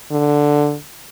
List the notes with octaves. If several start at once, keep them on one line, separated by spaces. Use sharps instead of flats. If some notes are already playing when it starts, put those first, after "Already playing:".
D3